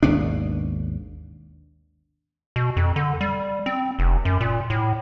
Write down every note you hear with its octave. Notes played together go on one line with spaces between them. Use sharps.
G#1 D#2 B2 D4
B2
F2
D3
G3
C4
F1
F#2
A#2
A2